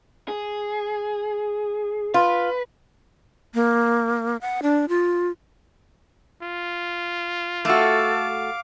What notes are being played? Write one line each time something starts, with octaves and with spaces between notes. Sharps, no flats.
G#4
F4 B4
A#3
F#5
D4
F4
F4
A3 F#4 A4 F5 D6